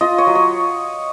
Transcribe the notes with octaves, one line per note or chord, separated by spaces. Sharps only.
F4 D#5
C#5
F#3
C#5